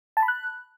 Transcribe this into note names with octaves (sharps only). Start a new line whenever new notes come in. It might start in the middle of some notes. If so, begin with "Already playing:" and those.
A5
B5
F#6